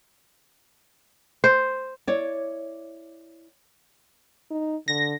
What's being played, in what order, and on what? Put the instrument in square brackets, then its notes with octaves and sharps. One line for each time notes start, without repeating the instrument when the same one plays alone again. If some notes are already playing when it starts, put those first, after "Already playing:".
[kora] C5
[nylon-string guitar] E4 C#5 D5
[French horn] D#4
[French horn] D3 [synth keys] A#6